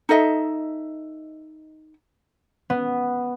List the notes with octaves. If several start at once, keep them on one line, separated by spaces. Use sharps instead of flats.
D#4 A4 D#5 E5
B3